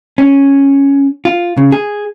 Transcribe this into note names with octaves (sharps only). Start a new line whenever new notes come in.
C#4
F4
C#3
G#4